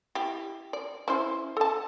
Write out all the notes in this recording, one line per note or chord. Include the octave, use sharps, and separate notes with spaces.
E4 G4
D5
C#4 E4 C5
A4 A5